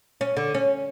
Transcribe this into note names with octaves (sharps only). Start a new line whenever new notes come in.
C#4
D3
C#4